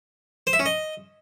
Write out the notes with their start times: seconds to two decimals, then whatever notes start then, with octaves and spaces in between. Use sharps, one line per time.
0.47 C5
0.53 E5
0.59 C#4
0.66 D#5